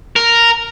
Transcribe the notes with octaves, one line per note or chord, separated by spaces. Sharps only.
A#4